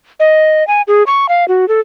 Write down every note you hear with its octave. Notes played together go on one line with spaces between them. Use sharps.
D#5
G#5
G#4
C#6
F5
F#4
A4